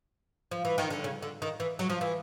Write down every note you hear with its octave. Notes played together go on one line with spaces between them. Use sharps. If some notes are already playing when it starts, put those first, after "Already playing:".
F3
E3
D#3
D3
C#3
D3
D#3
E3
F#3
F3
E3